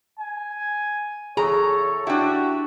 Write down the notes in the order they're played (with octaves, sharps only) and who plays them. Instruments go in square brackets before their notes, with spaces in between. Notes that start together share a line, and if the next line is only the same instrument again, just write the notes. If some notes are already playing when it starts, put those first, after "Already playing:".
[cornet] G#5
[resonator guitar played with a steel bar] E2 A#5 [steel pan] G#4 [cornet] A4 [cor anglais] C#5
[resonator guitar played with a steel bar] D4 E4 [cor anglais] F#4 [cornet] G4